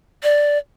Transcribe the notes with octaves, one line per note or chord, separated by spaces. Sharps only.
D5